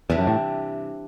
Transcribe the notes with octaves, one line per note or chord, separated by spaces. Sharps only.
E2 C3 E3 G3 D4
F#2
A2